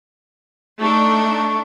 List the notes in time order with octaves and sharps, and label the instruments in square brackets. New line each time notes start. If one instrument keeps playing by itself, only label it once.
[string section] A3 D4 [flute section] D#4 A5 C#6